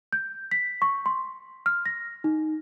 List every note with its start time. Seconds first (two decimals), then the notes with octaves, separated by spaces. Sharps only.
0.13 G6
0.51 B6
0.82 C#6
1.06 C6
1.66 F6
1.86 A#6
2.24 D#4